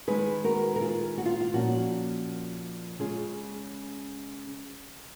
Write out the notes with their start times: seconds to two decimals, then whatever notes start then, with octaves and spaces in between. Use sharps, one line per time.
0.08 D#3 G#3 D#4 G#4 B4
0.44 F#4 A#4
0.76 A#4
0.81 F4 G#4
1.18 F#4
1.25 F4
1.41 F4
1.54 A#2 F3 A#3 C#4 F#4
2.99 C#3 G#3 C#4 F4 G#4